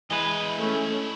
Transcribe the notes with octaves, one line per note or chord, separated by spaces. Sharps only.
E3 G#3 E4 B4 D#5
A3 C#4